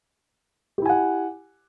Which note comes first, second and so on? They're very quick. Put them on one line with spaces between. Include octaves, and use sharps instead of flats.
G4 E4 G#5 F#5